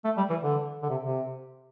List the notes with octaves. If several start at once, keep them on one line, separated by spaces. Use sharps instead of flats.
A3
G3
E3
D3
D3
C3
C3